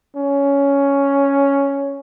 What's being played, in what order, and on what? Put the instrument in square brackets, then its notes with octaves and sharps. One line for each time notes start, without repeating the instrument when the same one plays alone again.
[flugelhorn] C#4